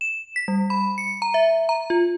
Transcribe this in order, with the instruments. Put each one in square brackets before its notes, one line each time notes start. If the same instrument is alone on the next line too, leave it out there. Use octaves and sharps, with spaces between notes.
[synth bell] E7
B6
G3
B5
C#7
A#5
E5
A#5
F4